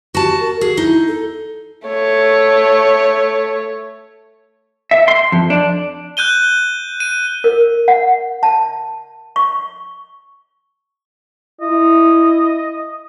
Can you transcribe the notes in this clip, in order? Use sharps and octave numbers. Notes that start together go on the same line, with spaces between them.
F#4 G4 A5
A#4
F#4 G#4
D#4 E4
A4
A3 C#5
E5
C6
F2
D4
F#6 G6 D#7 G7
D#7
A#4
F#5
A5
C#6
E4 D#5